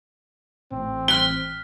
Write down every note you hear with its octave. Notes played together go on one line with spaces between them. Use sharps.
A1 C4
F6 F#6 B6 G7